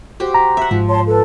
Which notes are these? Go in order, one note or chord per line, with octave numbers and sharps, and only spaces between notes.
F#4 G4 C5
A#5
E5 F#5
G#2 F3
C#5 A5 C6
A4 B4